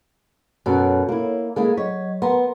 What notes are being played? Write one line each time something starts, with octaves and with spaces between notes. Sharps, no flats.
F#2 B2 A4 C#5
A#3 E4
G#3 A#3 E4 A4
F#3 C#5 D#5
B3 A#4 A#5 C6